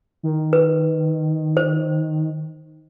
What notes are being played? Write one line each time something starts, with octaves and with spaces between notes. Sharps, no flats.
D#3
B4
C5